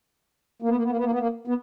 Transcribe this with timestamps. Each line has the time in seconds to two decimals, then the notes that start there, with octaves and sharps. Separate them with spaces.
0.62 A#3
0.69 B3
0.76 A#3
0.83 B3
0.90 A#3
0.97 B3
1.04 A#3
1.12 B3
1.19 A#3
1.47 B3